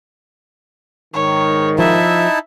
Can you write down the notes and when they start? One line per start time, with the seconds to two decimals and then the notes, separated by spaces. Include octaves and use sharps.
1.14 G#2 D#3 C#5
1.79 F3 D#4 E4 E5 A5